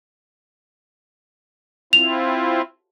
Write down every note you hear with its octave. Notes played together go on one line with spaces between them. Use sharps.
C4 E4 F4 F7